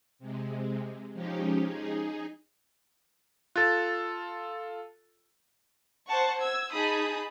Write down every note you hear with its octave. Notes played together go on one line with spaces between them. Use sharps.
C3 G#3
F3 G#3 C#4 D#4 G4
D#4 G#4
F4 A4 F#6 A6
C5 F#5 A5 C#6
E6 G#6
D#4 G#4 A5 B5 D#6